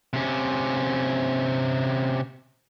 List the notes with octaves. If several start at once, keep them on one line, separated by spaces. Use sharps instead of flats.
C3 C#4